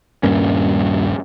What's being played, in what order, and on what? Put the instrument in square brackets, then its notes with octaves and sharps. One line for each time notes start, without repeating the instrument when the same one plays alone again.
[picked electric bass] D#1 G2 A#3 C#4